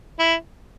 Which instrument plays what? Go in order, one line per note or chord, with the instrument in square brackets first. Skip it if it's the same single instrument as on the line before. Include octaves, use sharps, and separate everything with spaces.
[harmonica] E4